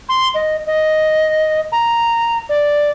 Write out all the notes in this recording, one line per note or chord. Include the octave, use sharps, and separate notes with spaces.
C6
D#5
D#5
A#5
D5